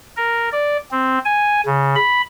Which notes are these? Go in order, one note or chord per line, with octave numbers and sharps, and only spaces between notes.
A#4
D5
C4
G#5
C#3
B5